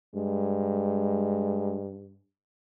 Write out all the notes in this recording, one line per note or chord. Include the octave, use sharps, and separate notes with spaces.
G2 G#3